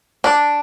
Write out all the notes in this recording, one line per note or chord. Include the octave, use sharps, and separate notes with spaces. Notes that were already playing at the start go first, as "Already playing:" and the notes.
D4